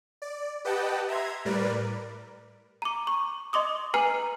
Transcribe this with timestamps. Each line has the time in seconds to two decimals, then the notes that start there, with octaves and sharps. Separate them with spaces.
0.22 D5
0.65 G4 B4 D#5 F#5 G5 A5
1.08 E5 A#5 C6 G#6
1.45 A2 G3 A#4 B4 D5
2.82 A#5 D6
3.07 C#6
3.53 D#5 C6 D6 D#6
3.94 B4 G#5 A#5 F6 C7 F#7